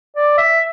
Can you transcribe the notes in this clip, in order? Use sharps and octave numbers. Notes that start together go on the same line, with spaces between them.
D5
E5